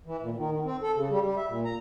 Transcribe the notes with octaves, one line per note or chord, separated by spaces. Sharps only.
E3
A#2
D#3
D#3
C4
A4
C#3
G3
G3
E5
A#2
A#5